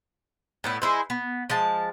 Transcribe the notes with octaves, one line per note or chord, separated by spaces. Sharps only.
A2 B3 E4
G#3 E4 C5
B3
F3 G#3 A5